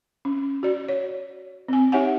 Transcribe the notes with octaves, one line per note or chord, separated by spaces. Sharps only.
C#4
F#4 D5
C#5
C4 G#5
D#4 G4 C#5 E5 F#5 G#5